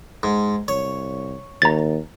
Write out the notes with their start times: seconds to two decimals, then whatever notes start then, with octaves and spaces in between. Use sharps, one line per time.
0.23 G#2
0.68 C2 C#5
1.62 D#2 A#5 A6